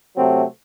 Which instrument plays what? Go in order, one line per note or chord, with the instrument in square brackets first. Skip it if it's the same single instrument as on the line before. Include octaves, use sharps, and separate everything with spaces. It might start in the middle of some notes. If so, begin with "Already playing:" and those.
[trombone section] C3 F#3 A3 C4